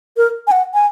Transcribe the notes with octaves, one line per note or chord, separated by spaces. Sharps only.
A#4
G#5
F#5
G#5